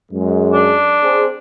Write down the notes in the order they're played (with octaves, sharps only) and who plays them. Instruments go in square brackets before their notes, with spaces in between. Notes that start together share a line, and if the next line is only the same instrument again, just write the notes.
[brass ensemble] F#2 G#3
[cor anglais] D4
[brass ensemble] C4 G#4